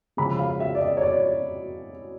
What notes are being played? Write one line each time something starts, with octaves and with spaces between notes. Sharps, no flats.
C#3 F3 G#3 B5
F5
E5
D5
D#5
C#5
D5